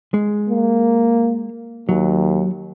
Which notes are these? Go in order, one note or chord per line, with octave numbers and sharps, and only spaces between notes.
G#3
A#3
D#2 F#3